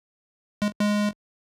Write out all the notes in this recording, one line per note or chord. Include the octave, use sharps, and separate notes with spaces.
G#3
G#3